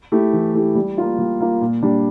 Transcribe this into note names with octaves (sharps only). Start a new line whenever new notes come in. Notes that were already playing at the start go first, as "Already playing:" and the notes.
A3 E4 G4
E3
A3 E4 G4
G3
A#3 F4
G3
A#3 F4
A#2
G3 D4